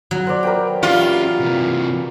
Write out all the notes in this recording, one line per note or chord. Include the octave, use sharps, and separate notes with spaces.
F#3
C5 D5
A#4 B4 G5
C#4 F4 G4
C3 E3